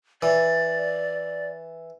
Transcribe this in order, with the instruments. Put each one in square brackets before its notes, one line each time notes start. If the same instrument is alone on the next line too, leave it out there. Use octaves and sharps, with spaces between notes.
[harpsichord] E3 [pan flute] D5